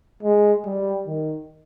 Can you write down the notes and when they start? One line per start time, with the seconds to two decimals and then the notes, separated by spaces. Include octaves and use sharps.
0.23 G#3
0.65 G3
1.07 D#3